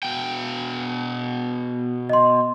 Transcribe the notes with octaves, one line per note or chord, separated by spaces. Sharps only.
B2 G5
D#5 C6